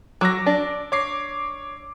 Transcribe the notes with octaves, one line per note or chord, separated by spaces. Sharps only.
F#3 D6 E6 A#6
D4
C#5 D6 C7